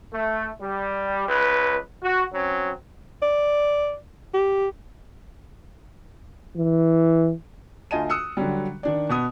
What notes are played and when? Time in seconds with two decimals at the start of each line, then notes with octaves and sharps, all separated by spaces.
0.13 A3
0.62 G3
1.29 C#2 B4
2.04 F#4
2.34 F#3 C4 C#4
3.22 D5
4.34 G4
6.57 E3
7.91 D2 F4 D#5 G#5 A5 D#7
8.10 D#6 E6 F#6 C#7
8.37 D3 F#3 G3
8.83 D#3 D4 D5
9.09 B2 B3 D#6